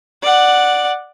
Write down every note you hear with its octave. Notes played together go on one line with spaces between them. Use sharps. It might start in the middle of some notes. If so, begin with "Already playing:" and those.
D5 F#5